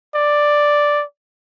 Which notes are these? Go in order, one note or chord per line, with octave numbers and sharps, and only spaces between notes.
D5